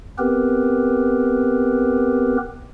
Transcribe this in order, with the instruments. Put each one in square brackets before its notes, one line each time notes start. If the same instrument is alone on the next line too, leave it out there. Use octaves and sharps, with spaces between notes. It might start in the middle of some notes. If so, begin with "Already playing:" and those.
[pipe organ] B3 C4 G4 A#4 B4